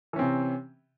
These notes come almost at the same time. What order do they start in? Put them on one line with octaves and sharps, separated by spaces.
E3 C#4 C4 C3